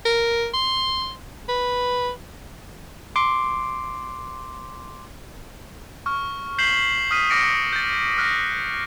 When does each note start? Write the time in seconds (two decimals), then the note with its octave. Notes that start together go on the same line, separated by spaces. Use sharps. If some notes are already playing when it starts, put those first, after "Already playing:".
0.05 A#4
0.54 C6
1.49 B4
3.16 C6 D6
6.06 C#6 F6
6.58 G6 B6 C7 E7 F#7 G7
7.11 D#6 F6 B6 D#7
7.30 D6 F6 A6 A#6 C#7 D7
7.73 G6 A6
8.17 D#6 F6 F#6 A#6